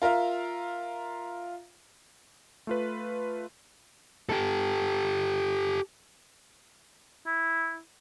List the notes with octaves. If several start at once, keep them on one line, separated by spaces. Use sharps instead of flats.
F4 A#4 E5 F5
A3 F4 B4
G4 A4
E4